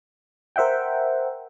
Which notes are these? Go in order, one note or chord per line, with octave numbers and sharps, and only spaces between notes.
A#4 C5 E5 F#5 G5